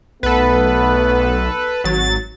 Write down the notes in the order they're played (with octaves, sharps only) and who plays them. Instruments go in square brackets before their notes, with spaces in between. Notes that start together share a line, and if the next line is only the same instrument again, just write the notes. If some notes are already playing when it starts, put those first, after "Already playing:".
[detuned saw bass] B1 [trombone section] A3 B3 [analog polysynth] A4 B4
[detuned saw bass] G#1 [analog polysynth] F#3 A6